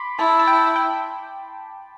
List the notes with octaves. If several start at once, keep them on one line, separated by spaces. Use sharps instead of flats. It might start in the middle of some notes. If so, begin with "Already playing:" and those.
Already playing: B5 C6 D6
E4 A5
A5
G5
G5